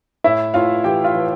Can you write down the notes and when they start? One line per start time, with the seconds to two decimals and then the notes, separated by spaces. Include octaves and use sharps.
0.24 A2 E4 E5
0.54 A2 F4 F5
0.84 E3 G4 G5
1.04 F4 F5
1.14 E3